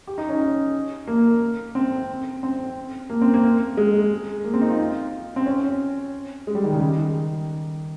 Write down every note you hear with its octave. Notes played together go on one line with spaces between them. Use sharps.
G4
D#4
C#4
A#3
C4
C4
A#3
C4
A#3
G#3
A#3
C4
D#4
F4
C4
C#4
G#3
G3
D#3
C#3
D#3